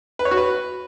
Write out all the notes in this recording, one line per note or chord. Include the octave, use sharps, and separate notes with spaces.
B4
C#5
F#4
B4